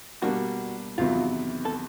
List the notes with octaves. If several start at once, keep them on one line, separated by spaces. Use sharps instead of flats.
B2 G3 A#3 D4 F#4
E2 C3 D#3 F#3 B3 F4
A4